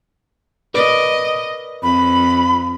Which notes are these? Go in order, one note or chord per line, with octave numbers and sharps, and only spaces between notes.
A#4 B4 D5 D#5
F2 B5